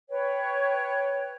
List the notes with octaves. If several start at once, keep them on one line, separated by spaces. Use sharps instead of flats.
B4 C#5 G5